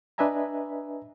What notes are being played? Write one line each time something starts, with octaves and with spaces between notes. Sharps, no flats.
D4 B4 D#5 E5 G#5 A#5